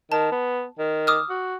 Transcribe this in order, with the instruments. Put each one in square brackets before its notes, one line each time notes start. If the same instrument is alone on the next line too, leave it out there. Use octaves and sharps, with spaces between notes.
[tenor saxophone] D#3 [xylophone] A5
[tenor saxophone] B3
D#3
[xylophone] D6 D#6 F6
[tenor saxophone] F#4